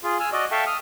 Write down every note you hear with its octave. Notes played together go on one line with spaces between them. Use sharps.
F4 G#4
G#5 E6 F6
F#4 D5 D#5
A4 E5 F5 G5 A5 C#6
D#6 F6